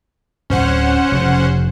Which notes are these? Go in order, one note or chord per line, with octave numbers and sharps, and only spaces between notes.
D1 G#1 C#4 C5 F#5
F1 C#3